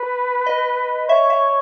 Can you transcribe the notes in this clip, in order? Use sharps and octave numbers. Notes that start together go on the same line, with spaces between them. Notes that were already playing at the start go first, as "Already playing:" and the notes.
Already playing: B4
D#5
C#5 E5
E5